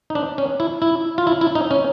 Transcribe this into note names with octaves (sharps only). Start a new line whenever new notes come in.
D#4
D4
C#4
E4
E4
F4
E4
E4
D#4
C#4